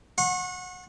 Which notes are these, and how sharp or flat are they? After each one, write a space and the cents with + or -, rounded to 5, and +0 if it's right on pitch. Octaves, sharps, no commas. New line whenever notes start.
F#5 -25 C#6 -40